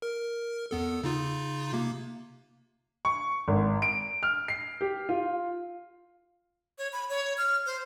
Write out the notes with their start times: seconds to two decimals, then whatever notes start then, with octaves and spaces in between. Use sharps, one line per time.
0.02 A#4
0.71 E2 B3 A4
1.04 C#3 D#4 F4
1.73 C3 A#3
3.05 C#6
3.48 G#1
3.82 D7
4.23 F6
4.48 C7
4.81 G4
5.09 F4
6.78 C#5
6.93 B5
7.09 C#5
7.38 F6
7.66 C5